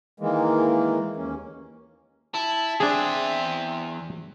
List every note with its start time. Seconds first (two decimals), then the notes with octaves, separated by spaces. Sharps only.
0.20 D#3 E3 G#3 A#3
1.16 D#2 A#3 C#4
2.34 E4 A5
2.80 E2 C4 D4 G#4 E5